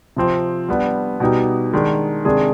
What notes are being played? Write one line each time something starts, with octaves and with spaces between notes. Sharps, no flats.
C3 F3 C4
G3 B3 D4
B2 G3 B3 D#4 G4
D#3 G#3 D4
C3 D#3 G#3 D4 G#4